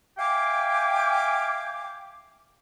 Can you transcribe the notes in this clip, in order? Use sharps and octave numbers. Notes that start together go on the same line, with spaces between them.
E5 F5 G5 G#5 D6